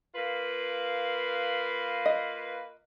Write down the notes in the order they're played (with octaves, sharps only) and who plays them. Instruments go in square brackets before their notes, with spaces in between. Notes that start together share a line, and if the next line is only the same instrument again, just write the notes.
[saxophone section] A#3 F4 B4
[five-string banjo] D#5